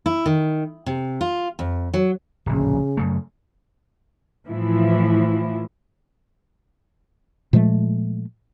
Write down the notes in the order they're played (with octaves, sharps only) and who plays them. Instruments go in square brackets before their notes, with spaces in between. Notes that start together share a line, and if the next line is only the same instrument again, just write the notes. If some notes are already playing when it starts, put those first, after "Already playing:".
[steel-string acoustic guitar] E4
D#3
C3
F4
F2
F#3
[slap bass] D1 A#1 [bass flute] C#3
[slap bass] F#2 C#3 A3
[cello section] A2 E3 F3 E4
[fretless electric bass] A#2 F3 G#3 A3